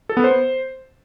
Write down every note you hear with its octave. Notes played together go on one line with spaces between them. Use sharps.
A4
B3
C5